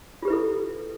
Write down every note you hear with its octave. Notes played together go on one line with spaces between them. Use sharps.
E4 F4 G4 A4 B4